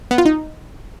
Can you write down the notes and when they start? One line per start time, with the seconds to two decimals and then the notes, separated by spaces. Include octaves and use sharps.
0.11 B3
0.18 F4
0.25 D#4